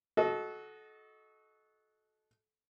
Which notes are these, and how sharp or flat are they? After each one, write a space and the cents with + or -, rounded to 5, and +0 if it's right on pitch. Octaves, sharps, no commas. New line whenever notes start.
F#4 +0 A4 -25 D#5 +5